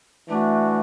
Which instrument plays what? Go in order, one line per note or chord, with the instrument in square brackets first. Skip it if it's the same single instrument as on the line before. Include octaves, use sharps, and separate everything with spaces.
[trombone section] E3 D4 F#4 [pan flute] A3